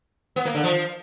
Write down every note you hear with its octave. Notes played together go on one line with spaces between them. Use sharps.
B3
A#3
D3
F3